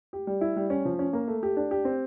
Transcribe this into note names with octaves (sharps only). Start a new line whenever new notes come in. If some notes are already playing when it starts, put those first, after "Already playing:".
G4
G3
E4
G3
C#4
F3
C#4
A#3
A3
G4
D4
G4
C4